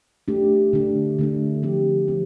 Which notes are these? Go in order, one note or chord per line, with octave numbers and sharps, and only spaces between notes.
A3 D4 G4
D3 A3 D4
D3 A3 D4
D3 F3 C4 G4
F3 C4 G4